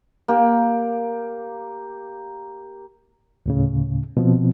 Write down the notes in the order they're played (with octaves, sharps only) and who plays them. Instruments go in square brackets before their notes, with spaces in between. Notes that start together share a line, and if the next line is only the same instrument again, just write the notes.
[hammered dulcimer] A#3 G4
[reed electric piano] D2 A2 C#3
B2 F3 C4